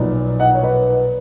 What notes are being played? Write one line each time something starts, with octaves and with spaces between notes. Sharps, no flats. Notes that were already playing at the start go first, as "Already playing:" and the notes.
Already playing: B1 A#2 F3 B3 D#4
D#5 F#5
C#5
B4 D#5